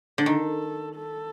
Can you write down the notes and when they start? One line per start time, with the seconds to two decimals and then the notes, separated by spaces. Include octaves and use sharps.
0.18 D3
0.26 D#3 A4
0.96 A4